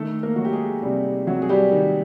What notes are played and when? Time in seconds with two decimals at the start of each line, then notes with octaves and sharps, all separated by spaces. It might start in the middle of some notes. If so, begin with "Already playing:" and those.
Already playing: D#3 A3 A4
0.23 A#3 A#4
0.36 F#3 F#4
0.45 G4
0.53 G#3 G#4
0.83 C3 G3 G4
1.27 C3 F#3 F#4
1.42 G#4
1.49 G3 G4
1.72 D#3